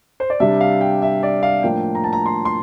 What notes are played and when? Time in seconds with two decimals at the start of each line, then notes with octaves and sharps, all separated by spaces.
0.20 C5
0.30 D5
0.40 C3 G3 D4 E5
0.61 F5
0.81 G5
1.02 E5
1.23 D5
1.43 F5
1.63 A2 F3 A#3 D4 G5
1.95 A#5
2.04 A5
2.13 A#5
2.26 C6
2.45 C6